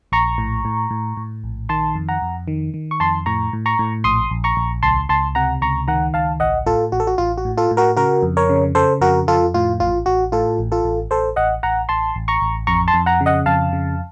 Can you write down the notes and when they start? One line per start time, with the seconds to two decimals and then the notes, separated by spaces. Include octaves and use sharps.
0.12 A#1 A#5 C#6
0.38 A2
0.65 A2
0.90 A2
1.17 A2
1.44 A#1
1.69 D#3 A5 C6
1.95 F2
2.08 F#5 A#5
2.22 F2
2.48 D#3
2.74 D#3
2.91 C#6
3.00 F2 A5 C6
3.26 A2 A#5 C#6
3.53 A2
3.66 A#5 C#6
3.79 A2
4.04 A#1 C6 D#6
4.31 A#1
4.44 A#5 C#6
4.57 A#1
4.83 C#2 A5 C6
5.09 C#2 A5 C6
5.35 C3 F#5 A#5
5.62 C#2 A#5 C#6
5.88 D#3 F#5 A#5
6.14 C#2 F5 A5
6.40 A1 D#5 F#5
6.66 A2 F4 A4
6.92 A1 F#4
7.00 A4
7.07 F#4
7.18 A1 F4
7.38 F#4
7.45 A2
7.57 F4 A4
7.71 A2
7.77 F#4 A#4
7.96 C#3 F#4 A#4
8.23 F2
8.37 A#4 C#5
8.49 C#3
8.75 C#3 A4 C5
9.01 F2 F#4 A#4
9.27 F2 F4 A4
9.54 A2 F4
9.80 A1 F4
10.06 A1 F#4
10.32 A2 F4 A4
10.59 A1
10.72 F4 A4
10.85 A1
11.11 A1 A4 C5
11.36 A1 D#5 F#5
11.63 A1 F#5 A#5
11.89 A1 A5 C6
12.16 A1
12.28 A#5 C#6
12.42 A1
12.67 F2 A#5 C#6
12.88 A5 C6
12.94 F2
13.06 F#5 A#5
13.21 C#3
13.26 D#5 F#5
13.46 F2 F5 A5
13.73 C#3